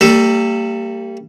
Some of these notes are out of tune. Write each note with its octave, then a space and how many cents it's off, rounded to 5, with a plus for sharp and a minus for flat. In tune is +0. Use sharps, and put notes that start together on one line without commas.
G3 +0 A#3 -40 A4 +0